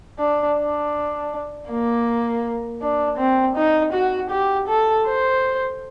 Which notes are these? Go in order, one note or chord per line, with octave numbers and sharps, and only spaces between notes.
D4
D4
A#3
D4
C4
D#4
F#4
G4
A4
C5